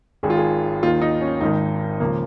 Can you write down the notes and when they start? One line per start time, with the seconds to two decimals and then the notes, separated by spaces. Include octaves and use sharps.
0.23 G#1 G#2 D#3 G#4
0.30 F4
0.38 G#4
0.83 D#2 D#3 F4
1.02 D#4
1.21 C#4
1.41 G#1 G#2 D#3 D#4
2.00 C#2 C#3 F3 A#3